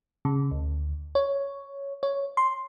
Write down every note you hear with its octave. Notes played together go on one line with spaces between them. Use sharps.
C#3
D2
C#5
C#5
C6